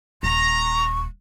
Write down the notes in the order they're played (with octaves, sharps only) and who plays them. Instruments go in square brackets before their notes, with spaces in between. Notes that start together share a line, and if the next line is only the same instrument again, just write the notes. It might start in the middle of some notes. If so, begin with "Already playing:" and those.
[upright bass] D#1 [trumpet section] A#5 [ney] C#6